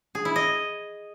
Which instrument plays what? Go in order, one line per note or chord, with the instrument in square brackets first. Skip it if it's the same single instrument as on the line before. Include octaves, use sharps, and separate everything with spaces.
[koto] G#4
E4
D#5